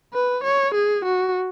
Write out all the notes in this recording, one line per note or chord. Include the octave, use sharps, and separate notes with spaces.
B4
C#5
G#4
F#4